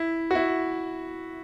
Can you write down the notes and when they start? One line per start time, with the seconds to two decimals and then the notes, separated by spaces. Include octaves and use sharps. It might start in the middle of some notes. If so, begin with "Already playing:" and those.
Already playing: E4
0.31 F#4
0.35 E4